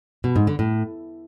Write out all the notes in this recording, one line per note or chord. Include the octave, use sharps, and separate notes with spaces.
B2
G#2
D3
A2